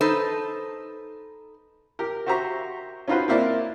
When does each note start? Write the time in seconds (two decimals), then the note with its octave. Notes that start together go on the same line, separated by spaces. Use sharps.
0.01 D#4 A4 B4 C5
1.99 G4 A#4
2.26 F#4 G4 C5 E5 A#5 C#6
3.08 C#4 D#4 F4 F#4 B4 C5
3.28 A#3 C4 E4 A#4 D5